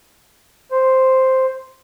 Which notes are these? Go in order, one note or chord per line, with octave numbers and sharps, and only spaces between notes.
C5